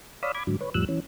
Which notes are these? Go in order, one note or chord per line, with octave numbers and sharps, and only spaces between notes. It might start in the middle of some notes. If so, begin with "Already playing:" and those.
C#5 D5 F5 B5 D#6 E6
B5 D6 G#6
G#2 D3 F#3
B4 C#5
F2 A2 F3 G3 E6 F#6
E3 C#4